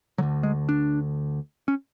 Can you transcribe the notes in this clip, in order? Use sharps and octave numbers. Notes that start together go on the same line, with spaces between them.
D2 D3 F#3
G#3
D4
C#4